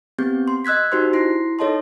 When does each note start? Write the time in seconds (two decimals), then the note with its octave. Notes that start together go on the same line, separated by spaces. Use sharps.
0.18 B3 C4 G4 G6
0.48 C6
0.65 D#5 E6 F#6 G#6 B6
0.92 D#4 F#4 G4 C5 C6
1.13 E4 C6 C7
1.59 D#4 A4 C#5 D#5 A5 C6